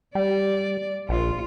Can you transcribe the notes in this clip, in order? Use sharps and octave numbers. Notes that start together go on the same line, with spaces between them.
G3 D5
A#1 F4